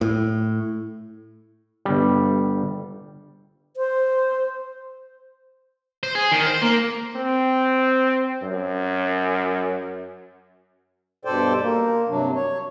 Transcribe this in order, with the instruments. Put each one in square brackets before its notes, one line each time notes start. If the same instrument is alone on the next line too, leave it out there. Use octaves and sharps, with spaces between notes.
[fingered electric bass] A2
[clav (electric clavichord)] G1 G3
[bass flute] C5
[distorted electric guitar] C5
G#4
D#3
C5
A#3
[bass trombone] C4
F#2
[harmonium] G2 B2 A4 C5 D5 G5
A#3
G2 C3 F#3 D4
C#5